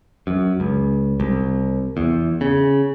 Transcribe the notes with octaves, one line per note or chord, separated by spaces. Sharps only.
F#2
C#2
C2
E2
C#3